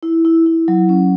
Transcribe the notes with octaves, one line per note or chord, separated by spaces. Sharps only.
E4
E4
E4
F#3
C#4